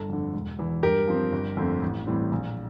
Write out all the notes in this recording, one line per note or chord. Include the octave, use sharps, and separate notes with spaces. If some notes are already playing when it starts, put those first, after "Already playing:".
Already playing: G1 A4
F2 D3
E1
E2 E3
G2 G4 A#4
F3 C4
G1
F2 D3 A3 C4
A1
A2 E3 G3 C4
A#1